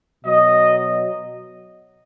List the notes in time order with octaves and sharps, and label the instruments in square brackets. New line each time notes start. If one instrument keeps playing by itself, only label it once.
[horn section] B2 F#3 D#5